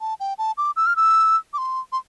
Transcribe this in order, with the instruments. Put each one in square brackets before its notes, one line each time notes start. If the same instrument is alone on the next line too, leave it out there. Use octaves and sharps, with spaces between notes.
[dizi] A5
G5
A5
D6
E6
F6
E6
D6
C6
C6